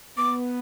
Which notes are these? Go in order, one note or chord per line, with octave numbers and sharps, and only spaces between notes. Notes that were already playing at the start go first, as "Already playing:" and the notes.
B3 D6